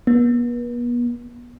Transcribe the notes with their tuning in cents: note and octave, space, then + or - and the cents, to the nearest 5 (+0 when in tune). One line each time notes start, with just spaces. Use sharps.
B3 -40